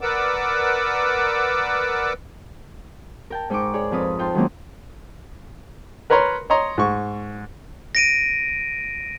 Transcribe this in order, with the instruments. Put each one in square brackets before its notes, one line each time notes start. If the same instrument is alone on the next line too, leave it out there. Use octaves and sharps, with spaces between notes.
[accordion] A#4 B4 D5 F#5 D6 E6
[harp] A#4 G5 A5
G#2 D#4 G5 C#6 D6
G#4 C#5 D5
F2 C4 F4 B4 D#6
D#4 F4 G5 A5 C6
D#3 F#3 G#3 A#3 C#4
[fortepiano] A#4 B4 C#5 A#5 C6
C#5 D#5 A#5 C6
G#2 C#6
[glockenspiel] A#6 D7 D#7